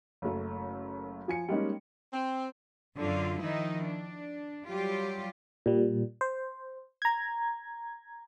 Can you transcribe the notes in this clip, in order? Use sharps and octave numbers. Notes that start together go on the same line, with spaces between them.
F#1 F#2 A3
F3 G#5 C#7
G3 G#3 A#3 C#4 D#4
C4
F#2 D3 F#3 F4
D#3 F3 D#4 E4
D4
F#3 G3 F4 G4
A#2 G3
C5
A#5 G#6